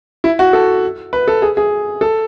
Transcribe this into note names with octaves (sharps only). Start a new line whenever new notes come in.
E4
F#4
A4
B4
A4
G#4
G#4
A4